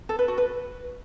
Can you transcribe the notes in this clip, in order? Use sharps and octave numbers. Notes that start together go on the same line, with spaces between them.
A4
B4
F#4
B4